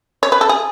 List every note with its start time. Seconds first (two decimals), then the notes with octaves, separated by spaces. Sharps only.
0.23 C#5
0.32 B4
0.41 A4
0.49 G#4